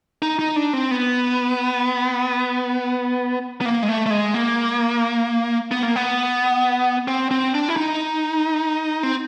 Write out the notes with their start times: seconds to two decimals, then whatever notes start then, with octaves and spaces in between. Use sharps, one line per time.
0.22 D#4
0.39 D#4
0.56 D4
0.73 C4
0.91 B3
3.61 B3
3.66 A#3
3.83 G#3
3.89 A3
4.06 A3
4.10 G#3
4.34 A#3
5.71 B3
5.83 A#3
5.96 B3
7.08 C4
7.31 C4
7.54 D4
7.69 E4
7.76 D#4
9.03 C4